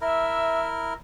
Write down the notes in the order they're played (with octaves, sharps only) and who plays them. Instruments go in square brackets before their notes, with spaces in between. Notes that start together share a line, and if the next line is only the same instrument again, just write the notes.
[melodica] E4 A#4 [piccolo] E5